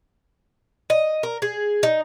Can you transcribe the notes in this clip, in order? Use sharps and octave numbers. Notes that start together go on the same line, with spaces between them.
D#5
A#4
G#4
D#4